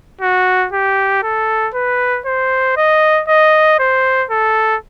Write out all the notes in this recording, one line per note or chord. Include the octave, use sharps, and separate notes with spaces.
F#4
G4
A4
B4
C5
D#5
D#5
C5
A4